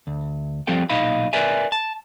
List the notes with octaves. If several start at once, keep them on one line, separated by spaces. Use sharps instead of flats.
D2
F3 G3 C4 A4 G5
B1 A#2 D#4 D#5 F5 B5
A#4 B4 D5 E5 G#5
A5